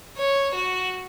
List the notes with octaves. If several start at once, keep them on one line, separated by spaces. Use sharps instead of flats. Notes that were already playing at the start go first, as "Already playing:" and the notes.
C#5
F#4